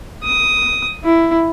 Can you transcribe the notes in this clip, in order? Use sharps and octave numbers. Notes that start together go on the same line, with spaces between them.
D#6
E4